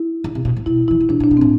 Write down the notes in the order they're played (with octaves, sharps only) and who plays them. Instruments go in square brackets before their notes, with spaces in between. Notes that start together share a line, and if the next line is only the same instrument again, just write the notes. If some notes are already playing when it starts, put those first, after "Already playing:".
Already playing: [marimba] E4
[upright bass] D3
C3
B2
A2
[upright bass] B2 [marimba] E4
[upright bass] E3 [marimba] E4
[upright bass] D3
[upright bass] C3 [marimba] D4
[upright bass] B2
[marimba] D4
[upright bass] B2
[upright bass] A2 [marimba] C4